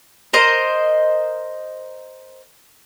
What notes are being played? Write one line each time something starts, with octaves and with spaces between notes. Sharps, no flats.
A#4 C5 D#5